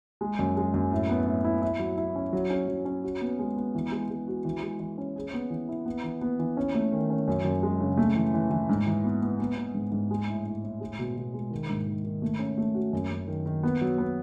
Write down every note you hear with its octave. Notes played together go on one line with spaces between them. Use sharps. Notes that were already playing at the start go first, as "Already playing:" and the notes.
G#3
F#2
G#3
F#2
A2
B3
A2
E4
E4
F#3
E4
C#4
F#3
C#4
F#3
C#4
F#4
B3
G#3
B3
E3
G#3
G#3
F#4
E3
G#3
E3
C#4
G#4
B3
E3
E4
B3
E3
B3
E3
C#4
A3
D#3
C#4
F#2
F#2
G#3
C#3
A3
E3
E3
E3
G#2
E3
B3
B3
B3
B3
G#2
G#2
G#3
A2
A2
A2
G#3
B2
B2
G#3
D#3
G#2
D#3
D#3
A3
C#4
A3
F#4
F#2
F#2
D#3
D#3
B3
F#3
B3